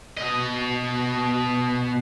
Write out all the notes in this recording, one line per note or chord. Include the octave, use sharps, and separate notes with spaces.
B2 D#5